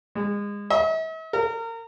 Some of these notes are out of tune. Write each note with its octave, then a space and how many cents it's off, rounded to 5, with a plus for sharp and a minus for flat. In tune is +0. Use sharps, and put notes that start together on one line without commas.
G#3 -30
E5 -45
A#4 -30